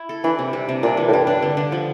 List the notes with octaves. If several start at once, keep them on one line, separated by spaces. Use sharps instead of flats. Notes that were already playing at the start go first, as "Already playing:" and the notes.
Already playing: E4
A4
E3 D4
C3
G3
C3
A#2 D4
E3
A2
G2 G3
D4
D3
D3
F3